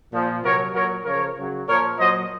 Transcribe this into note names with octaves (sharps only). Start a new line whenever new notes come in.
A#2 F3
C3 F#3 A#4 C#5
A#2 F#3 A#4 C#5
C#3 F3 A#4 C#5
C#3 F#3
A#2 F3 A#4 C#5
A#2 F#3 C5 D#5